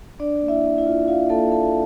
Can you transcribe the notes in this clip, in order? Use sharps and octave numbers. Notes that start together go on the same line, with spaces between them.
D4 D5
A#3
E4 E5
A#3
E4 E5
F4
F4 F5
A#3 A4 A5
A#3 A4 A5